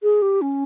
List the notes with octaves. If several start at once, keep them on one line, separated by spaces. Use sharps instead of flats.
G#4
G4
C#4